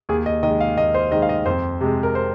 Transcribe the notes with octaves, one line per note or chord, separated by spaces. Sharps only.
D#2 G#4
D#5
D#3 G#3 D#5
F5
D#2 D#5
C5
D#3 G#3 D#5
F5
D#5
F2 C5
C3 G#3
A#4
C5